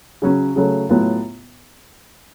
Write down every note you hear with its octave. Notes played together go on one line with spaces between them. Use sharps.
C#3 F#3 C#4
C#3 F#3 A3
A2 F#3 B3 F4